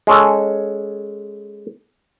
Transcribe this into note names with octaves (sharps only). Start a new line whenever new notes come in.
G#3 C#4 A4